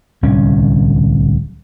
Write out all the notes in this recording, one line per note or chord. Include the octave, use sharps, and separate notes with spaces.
D1 C2 D3 C#4